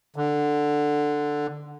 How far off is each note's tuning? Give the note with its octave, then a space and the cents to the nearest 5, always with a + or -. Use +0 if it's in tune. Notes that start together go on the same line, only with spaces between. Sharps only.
D3 +5